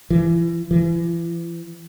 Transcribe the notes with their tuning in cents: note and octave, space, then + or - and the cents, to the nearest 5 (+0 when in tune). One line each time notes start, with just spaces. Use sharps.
E3 +35
E3 +40